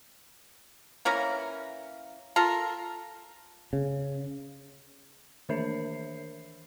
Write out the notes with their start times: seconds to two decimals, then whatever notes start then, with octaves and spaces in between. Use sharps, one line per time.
1.05 E3 A#3 C#4 A#4
2.36 F4 A4 A#4
3.73 C#3
5.49 D#3 E3 D4 A#4 E5 C7